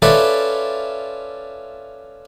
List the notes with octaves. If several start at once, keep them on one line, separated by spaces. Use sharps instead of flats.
C#4 F4 A4 B4 D5 E5